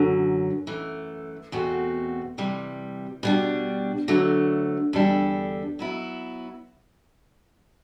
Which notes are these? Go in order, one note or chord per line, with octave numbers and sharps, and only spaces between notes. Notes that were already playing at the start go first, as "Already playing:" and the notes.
Already playing: F#2 D3 F#3
F#2 E3 A3
E2 B2 A3 C4 F#4
C3 E3 G3
B2 G3 D4
D2 D3 F#3 A3
E2 D3 G3 D4 A4
F#3 B3 E4